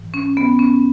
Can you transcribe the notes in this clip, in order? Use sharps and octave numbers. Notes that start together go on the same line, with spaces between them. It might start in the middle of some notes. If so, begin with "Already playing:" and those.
Already playing: G#2 E3
C#4
B3
C#4